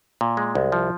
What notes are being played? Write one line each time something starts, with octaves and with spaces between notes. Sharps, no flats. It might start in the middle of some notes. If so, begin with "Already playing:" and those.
A#2
G#3
C2
F3